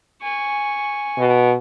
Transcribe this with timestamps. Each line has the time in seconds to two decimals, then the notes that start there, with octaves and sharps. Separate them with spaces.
0.22 G#5 C#6
1.18 B2